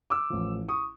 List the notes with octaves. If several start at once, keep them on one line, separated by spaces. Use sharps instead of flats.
D6 E6
A1 A2 F3
C#6 D#6